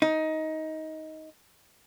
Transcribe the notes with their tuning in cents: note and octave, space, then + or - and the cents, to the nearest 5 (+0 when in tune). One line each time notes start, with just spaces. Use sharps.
D#4 +15